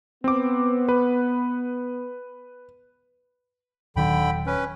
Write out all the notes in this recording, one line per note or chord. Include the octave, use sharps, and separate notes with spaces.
B3 C4 D6
B4
D#1 D3 D#3 F#3 G5 B5
C#4 B4